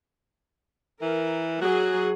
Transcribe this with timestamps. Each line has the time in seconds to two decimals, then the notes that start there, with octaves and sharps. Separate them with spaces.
1.01 E3 A#4
1.61 F#3 F#4 G#4